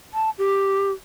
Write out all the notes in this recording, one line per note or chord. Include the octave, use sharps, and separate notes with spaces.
A5
G4